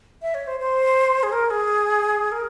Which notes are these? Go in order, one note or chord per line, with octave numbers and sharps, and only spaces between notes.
E5
C#5
C5
C5
G#4
A#4
G#4
A#4